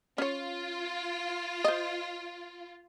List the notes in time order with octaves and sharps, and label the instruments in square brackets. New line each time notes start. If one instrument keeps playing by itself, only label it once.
[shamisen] C#4 C#5 [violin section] F4
[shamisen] C5 D#5